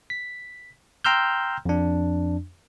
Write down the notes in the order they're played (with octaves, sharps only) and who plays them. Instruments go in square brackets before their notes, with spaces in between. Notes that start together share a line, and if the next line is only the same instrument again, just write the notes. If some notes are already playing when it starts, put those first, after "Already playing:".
[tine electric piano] B6
G5 A#5 C6 E6 F6 G6
F2 D4